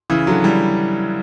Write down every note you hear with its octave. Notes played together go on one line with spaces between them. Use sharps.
C#3 E3
D3 F#3
E3 G3